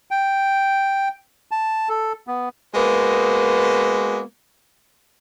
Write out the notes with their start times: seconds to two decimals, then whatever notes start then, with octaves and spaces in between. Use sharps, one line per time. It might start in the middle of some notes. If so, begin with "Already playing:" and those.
0.11 G5
1.51 A5
1.89 A4
2.27 B3
2.74 G#3 A#3 B3 F#4 C5